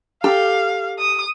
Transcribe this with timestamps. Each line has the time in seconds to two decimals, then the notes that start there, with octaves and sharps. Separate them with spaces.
0.24 G4 A4 F5
0.99 D#6